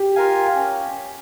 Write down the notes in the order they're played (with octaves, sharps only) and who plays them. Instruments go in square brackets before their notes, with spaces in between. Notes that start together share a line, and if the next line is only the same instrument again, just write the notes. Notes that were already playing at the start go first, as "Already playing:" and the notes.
Already playing: [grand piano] G4
[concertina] F4 A#4 F5 G#5
C#4